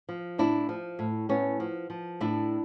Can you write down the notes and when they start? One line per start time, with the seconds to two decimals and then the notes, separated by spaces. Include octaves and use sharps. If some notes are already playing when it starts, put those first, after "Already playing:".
0.09 F3
0.38 A2 D4 E4
0.69 F3
0.99 A2
1.29 A2 B3 C#4
1.60 F3
1.90 F3
2.21 A2 D4 E4